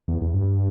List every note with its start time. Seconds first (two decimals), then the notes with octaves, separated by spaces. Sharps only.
0.08 E2
0.22 E2
0.34 G2